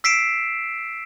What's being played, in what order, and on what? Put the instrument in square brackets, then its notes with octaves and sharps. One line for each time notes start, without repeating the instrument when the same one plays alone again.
[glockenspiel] E6 B6 C7 D7 E7